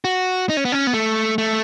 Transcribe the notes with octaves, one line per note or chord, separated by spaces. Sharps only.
F#4
D#4
C#4
B3
C#4
B3
A3
A3